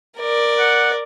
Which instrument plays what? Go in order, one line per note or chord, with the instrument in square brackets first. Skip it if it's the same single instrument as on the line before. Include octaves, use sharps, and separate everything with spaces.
[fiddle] A#4 D5
[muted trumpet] F#5